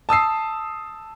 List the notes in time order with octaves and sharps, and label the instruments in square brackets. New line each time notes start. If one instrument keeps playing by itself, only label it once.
[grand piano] A5 D#6 E6 C7